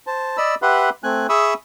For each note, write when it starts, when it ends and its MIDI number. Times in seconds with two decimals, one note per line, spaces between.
0.07 0.37 72
0.07 0.37 81
0.37 0.55 74
0.37 0.55 75
0.37 0.55 83
0.37 0.55 88
0.62 0.90 67
0.62 0.90 71
0.62 0.90 76
0.62 0.90 78
0.62 0.90 83
0.62 0.90 84
1.03 1.27 57
1.03 1.27 60
1.03 1.27 80
1.03 1.27 90
1.29 1.54 68
1.29 1.54 76
1.29 1.54 83
1.29 1.54 85
1.29 1.54 87
1.29 1.54 88